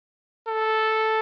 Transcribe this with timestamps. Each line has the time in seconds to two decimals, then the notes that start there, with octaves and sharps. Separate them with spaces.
0.48 A4